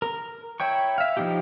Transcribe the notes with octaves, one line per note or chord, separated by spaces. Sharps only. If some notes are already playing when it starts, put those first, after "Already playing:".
A#4
E4 C#5 G5 C#6
E5 F5
F3 C4 D#4 E4 G4